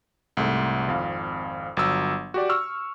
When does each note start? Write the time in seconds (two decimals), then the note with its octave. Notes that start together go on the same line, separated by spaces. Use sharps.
0.37 C2 G#2 A3
0.87 G#1 F2 F5
1.77 G1 F#3 E6
2.34 F#4 G4 D5
2.49 C#6 E6 F6